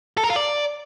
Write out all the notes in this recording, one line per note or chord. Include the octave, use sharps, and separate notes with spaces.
A4
A#4
F4
D5